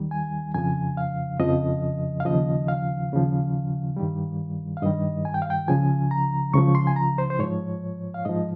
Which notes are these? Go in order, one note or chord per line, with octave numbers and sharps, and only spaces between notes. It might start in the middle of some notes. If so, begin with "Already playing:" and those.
Already playing: D#2 D#3 G3
G#5
F2 C#3 F3 G#5
F5
F2 C#3 F3 D#5
F5
D#2 C#3 F3 D#5
F5
D#2 C#3 F3
G2 D#3 G3
F5
G2 D#3 G3 D#5
G#5
G5
F5
G5
C#2 C#3 F3 G#5
A#5
C#2 C#3 F3 C#6
C6
G#5
A#5
C5
C5
G#2 F3 C#5
F5
G#2 F3 D#5